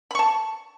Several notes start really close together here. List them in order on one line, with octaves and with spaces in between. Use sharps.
B5 C#6 A5